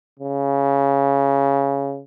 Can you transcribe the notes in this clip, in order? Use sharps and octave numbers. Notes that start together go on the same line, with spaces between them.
C#3